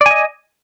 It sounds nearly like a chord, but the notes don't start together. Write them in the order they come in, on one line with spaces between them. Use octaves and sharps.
D5 G#5 D#5